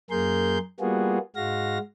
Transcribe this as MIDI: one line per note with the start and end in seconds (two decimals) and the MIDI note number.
0.10 0.58 42
0.10 0.58 58
0.10 0.58 68
0.10 0.58 70
0.10 0.58 84
0.10 0.58 91
0.80 1.18 55
0.80 1.18 58
0.80 1.18 59
0.80 1.18 65
0.80 1.18 66
0.80 1.18 68
1.36 1.78 44
1.36 1.78 56
1.36 1.78 66
1.36 1.78 77
1.36 1.78 94